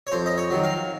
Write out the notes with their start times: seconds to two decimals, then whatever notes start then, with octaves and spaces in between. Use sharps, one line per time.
0.07 C#5
0.12 F2 C5
0.26 D#5
0.38 C#5
0.51 D#3 F#3
0.64 F5